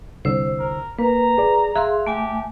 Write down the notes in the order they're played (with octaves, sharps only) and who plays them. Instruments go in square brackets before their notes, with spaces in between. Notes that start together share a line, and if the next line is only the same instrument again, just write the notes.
[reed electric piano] C2 D3 E6 [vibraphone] C5
[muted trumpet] A#4
[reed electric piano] A#3 [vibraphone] B4 [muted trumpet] A#5
[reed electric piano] G#4 D5
[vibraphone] G#4 F5 C6 [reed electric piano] E5 F#6
[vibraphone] A3 G#5 A5 [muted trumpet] G4